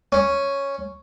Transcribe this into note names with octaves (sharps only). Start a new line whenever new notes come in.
C#4